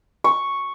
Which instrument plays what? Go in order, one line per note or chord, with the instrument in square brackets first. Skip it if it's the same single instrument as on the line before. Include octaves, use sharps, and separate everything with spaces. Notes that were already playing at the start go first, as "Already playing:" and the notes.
[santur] C#6